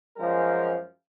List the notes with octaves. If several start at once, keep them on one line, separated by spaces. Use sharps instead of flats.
F#2 F3 G#3 A#4